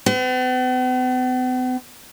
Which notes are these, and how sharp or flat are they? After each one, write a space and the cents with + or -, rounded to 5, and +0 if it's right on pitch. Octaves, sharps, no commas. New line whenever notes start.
B3 +45